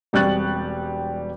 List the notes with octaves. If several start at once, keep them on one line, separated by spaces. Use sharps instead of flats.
E1 G3 C4 C#6 F#6 A6